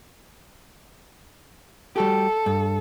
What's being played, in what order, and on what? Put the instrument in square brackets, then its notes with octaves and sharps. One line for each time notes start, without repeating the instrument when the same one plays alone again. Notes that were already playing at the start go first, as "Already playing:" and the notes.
[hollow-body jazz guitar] G3 F#4 G4 [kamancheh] A4
[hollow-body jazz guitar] G2